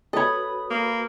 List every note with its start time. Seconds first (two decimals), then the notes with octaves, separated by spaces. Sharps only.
0.13 F#4 A4 B4 C#5 B5 D#6
0.70 A#3